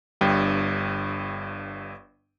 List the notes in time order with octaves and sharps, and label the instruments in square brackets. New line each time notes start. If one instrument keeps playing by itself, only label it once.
[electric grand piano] G1 G2 G5